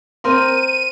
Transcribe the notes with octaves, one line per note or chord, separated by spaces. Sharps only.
C4 A#4 C6 D#7